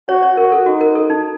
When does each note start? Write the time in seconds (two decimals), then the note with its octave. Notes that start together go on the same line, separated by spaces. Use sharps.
0.09 F#4 C#5
0.23 C#5
0.37 F#4 A#4
0.52 A4
0.66 D#4 F#4
0.81 A#4
0.95 A4
1.10 D#4